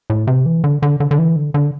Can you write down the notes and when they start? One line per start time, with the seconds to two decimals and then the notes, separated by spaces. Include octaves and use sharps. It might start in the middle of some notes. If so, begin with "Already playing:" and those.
0.10 A2
0.27 C3
0.46 E3
0.64 D3
0.82 D3
1.00 D3
1.11 D3
1.18 E3
1.36 D3
1.54 D3